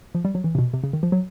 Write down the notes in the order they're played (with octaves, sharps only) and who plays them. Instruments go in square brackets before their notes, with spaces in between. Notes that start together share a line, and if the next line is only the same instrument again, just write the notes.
[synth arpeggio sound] F3
G3
F#3
E3
C3
B2
C3
C#3
D#3
F3
F#3